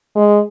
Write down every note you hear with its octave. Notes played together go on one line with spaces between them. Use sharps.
G#3